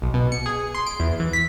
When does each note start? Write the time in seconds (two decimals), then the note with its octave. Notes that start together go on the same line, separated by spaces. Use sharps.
0.02 B1
0.14 B2
0.32 C#7
0.46 G#4
0.75 C6
0.87 D7
1.00 E2
1.20 E3
1.33 B6